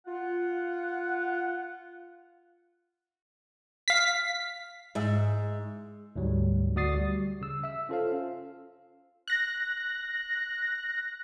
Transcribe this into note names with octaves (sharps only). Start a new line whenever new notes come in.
F4 F#5
F5 B6
G#2 E5
D2 G#2 F#3 G3
D2 F#4 D5 D#6 A6 C7
G3
C#3 E6
E5 E6
C#4 F4 A4 C5 F5
F#6 A#6